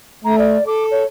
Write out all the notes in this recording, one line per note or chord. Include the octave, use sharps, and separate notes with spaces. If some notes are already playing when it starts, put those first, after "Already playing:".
A3 A#5
D5
A4 D6
C#5